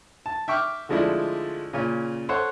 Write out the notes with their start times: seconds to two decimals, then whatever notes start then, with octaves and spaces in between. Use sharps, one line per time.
0.26 A5
0.48 E5 G5 C#6 D6 F6
0.89 D3 F3 G#3 A3 D4 E4
1.73 A#2 C#3 C#4
2.29 A4 C5 C#5 F#5